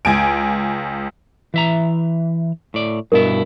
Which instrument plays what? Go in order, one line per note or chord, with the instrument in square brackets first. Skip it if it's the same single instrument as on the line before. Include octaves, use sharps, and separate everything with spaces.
[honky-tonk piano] C#2 G#5 D7
[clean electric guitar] E3 E5 A#5
A2 D5
[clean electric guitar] G2 B2 E4 [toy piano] A#4 D#5